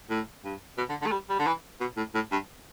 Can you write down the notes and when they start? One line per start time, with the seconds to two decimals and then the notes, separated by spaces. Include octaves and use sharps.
0.10 A2
0.44 G2
0.78 B2
0.89 D3
1.01 D3
1.06 A3
1.12 G3
1.29 G3
1.39 D3
1.47 E3
1.81 B2
1.97 A2
2.14 A2
2.32 G2